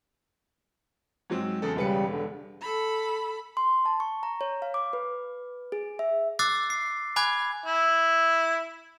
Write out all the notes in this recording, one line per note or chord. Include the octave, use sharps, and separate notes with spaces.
G#2 F#3 C4
E2 C#3 A4
E1 C#3 G3 B4 C#7
D3
A4 B5
C6
A5
C#6
A#5
C#5
F5
D6
B4
G#4
E5
D6 E6 F#6 A6 C7
C7
G#5 B5 D6 F#6 G#6
E4